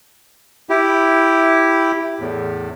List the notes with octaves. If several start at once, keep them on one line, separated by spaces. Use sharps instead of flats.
E4 G4
E2 A2